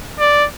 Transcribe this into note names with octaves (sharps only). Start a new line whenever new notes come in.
D5